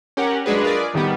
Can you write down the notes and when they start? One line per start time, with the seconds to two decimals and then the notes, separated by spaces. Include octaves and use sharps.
0.17 C#4 G4 A#4 F#5
0.46 F#3 G#3 D4 G#4 B4
0.63 F4 G#4 A#4 B4 D5
0.94 A2 D#3 G3 B3